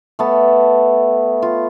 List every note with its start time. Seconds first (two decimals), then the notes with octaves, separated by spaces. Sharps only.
0.19 A3 B3 A5
1.42 F4